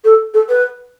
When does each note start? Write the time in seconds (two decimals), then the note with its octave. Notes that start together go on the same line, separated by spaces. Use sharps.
0.04 A4
0.34 A4
0.49 B4